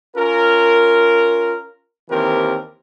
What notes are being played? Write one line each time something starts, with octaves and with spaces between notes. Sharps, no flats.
C#4 F4 A#4
D#2 E3 C4 G4 A#4